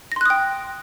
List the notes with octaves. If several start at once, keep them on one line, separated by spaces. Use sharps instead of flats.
G5 C6 D#6 F#6 A#6